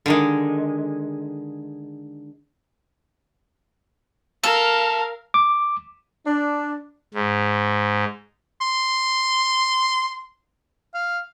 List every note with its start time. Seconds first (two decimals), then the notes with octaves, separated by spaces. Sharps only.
0.06 D3 D#3 G#3
4.44 A4 A#4 F5
5.34 D6
6.26 D4
7.14 G#2
8.61 C6
10.94 F5